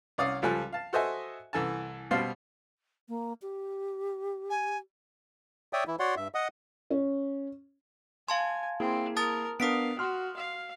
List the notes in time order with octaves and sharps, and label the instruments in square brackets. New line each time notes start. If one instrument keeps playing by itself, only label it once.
[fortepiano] C2 C#4 D5 F5 D#6 F6
C#2 F3 G3 A4 G#5 F#6
F5 A5
F#4 A4 C5 D#5 E5 G#5
C2 E3 A4 G#5 A5
B2 G3 C5 F5 A5 C6
[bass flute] A#3
G4
[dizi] G#5
[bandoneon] C#5 D5 E5 G5 D#6
E3 E4
F#4 C#5 D5 F#5 C6
G2 E5
D#5 F#5 D#6
[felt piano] C#4
[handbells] F5 A5 C6 [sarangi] G#5
[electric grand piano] A#3 E4 G#4 [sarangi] C4
[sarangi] A#4 [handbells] A5 D#6 A6
[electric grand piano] B3 D4 A#4 [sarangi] F5 [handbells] D#6 B6 D7
[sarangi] F#4 [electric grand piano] C6 F6
[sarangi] F5